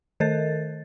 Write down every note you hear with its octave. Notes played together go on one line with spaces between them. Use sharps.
D#3 A4 A#4 D#5 A6